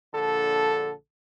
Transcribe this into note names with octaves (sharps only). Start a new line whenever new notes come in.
A#1 D3 A4